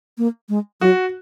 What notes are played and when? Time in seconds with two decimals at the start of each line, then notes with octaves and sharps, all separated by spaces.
0.18 A#3
0.49 G#3
0.81 F#3 F#4